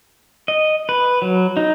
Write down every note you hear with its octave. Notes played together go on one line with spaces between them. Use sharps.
D#5
B4
F#3
D#4